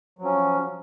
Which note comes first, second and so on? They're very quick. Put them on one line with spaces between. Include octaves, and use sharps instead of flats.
F#3 F3 C#4